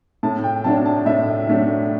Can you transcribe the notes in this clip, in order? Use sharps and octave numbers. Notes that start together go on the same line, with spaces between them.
A2 A5
G5
F#3 A3 D4 A5
A5
A2 E5
F#3 A3 D4